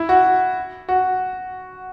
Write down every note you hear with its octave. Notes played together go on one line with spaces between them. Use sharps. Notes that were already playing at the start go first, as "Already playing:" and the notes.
Already playing: E4
F#4
F#4